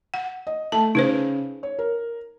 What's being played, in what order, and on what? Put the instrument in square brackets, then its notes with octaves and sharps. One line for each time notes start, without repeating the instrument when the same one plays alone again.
[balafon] F#5
[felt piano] D#5
[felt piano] A3 [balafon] A5
[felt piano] C#3 [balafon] D#4 B4 C5
[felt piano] C#5
A#4